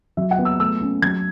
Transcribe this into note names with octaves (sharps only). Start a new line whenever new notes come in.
F#3 E5
F#5
B3
E6
A3 E6
C#4
F#3 G#6